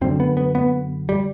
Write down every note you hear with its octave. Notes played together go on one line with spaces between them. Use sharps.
F#2 D3 C4
B3
B3
B3
G3